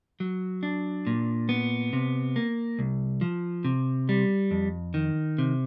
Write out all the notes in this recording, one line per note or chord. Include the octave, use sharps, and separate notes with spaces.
F#3
D4
A#2
B3
C3
A#3
C2
F3
C3
G3
F2
D#3
C3